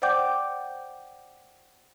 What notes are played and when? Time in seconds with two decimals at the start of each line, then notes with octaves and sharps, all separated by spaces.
0.02 C5 D5 F#5 G5 D6 G6